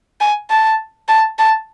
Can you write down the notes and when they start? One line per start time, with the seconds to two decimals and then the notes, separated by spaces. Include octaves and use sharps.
0.21 G#5
0.50 A5
1.08 A5
1.38 A5